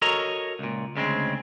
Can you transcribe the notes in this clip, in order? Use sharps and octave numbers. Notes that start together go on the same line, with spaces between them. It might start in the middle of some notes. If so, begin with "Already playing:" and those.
F#4 A4 A#4 C#5 D#5 A#5
C#2 A#2
D2 C#3 G#3 C4